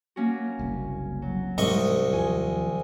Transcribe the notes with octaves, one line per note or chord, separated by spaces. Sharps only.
A#3 C#4 F#4
F#1 C2
F#3
C2 G#2 E3 D#5 C#6
D#2 F3 G#5